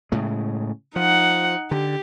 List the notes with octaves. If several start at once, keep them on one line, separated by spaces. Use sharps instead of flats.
A2 C#3 G#3
F3 D#4 F#5
D3 G4